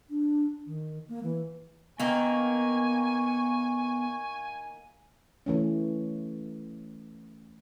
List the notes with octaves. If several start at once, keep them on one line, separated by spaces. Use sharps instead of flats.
D4
D#3
A#3
E3
D#3 A#3 B3 G5 G#5 C#6
E3 A3 C#4